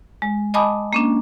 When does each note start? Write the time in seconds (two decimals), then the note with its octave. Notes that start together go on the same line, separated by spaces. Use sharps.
0.22 G#3
0.54 D#5 G#5 A5 B5 D6 D#6
0.93 A#3 C#4 D4